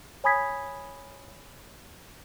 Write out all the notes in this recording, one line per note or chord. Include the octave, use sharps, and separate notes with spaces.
C#5 G#5 B5 D#6 G#6 B6